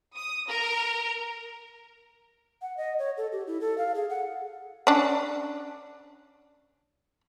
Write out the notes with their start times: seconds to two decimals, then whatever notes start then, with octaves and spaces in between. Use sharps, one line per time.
0.17 D#6
0.48 A#4
2.62 F#5
2.77 D#5
2.99 C#5
3.17 A4
3.32 G4
3.47 E4
3.61 A4
3.78 F5
3.95 G#4
4.10 F#5
4.87 C#4 D4